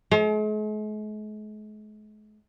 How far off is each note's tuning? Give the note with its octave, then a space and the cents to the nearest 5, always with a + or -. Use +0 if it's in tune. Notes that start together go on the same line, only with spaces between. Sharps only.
G#3 +45